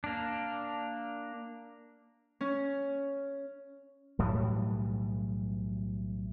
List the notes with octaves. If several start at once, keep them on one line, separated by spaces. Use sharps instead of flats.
A#3 D4
C#4
B1 A2 E3 G3